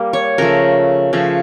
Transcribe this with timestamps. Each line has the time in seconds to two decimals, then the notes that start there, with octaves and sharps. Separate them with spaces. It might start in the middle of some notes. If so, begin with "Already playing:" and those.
Already playing: G3 A#3
0.13 C#5
0.38 C#3 F3 A3 A#4
1.13 C#3 F3 A3